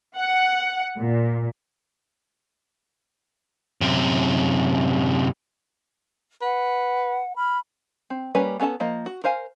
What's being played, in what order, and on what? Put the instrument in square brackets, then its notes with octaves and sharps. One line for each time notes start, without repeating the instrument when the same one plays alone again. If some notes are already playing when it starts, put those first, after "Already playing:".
[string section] F#5
A#2
[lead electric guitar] F#2 C3
[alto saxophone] B4 [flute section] F#5
[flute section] B5 F6
[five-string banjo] C4
G3 A#3 C#4 B4 G#5
B3 C#4 A4 F5 A5
F3 A#3 D#5
F#4
A#4 C5 F5 G#5